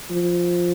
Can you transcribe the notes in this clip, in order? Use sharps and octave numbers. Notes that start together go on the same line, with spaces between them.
F3